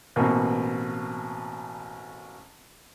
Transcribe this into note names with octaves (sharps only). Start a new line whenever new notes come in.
A1 B2 A#3 C4 C#6